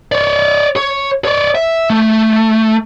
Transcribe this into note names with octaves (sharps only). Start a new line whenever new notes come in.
C#5 D5
C#5
C#5 D5
E5
A3